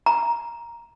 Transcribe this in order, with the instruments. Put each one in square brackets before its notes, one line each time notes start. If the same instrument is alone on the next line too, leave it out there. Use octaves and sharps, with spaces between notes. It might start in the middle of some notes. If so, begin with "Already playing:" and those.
[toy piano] A#5